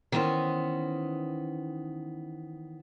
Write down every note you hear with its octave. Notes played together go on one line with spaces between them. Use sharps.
D#3 E3 B3 C#4 C5